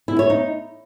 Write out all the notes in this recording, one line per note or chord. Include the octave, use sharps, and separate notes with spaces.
E4
C#5
D#4